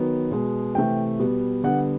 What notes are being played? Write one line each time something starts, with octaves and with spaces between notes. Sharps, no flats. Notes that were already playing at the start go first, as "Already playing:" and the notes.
Already playing: D#3 F#3 B3
B2 G#3 B3
C3 E3 A3 G5
B2 G3 B3
D3 G3 B3 F#5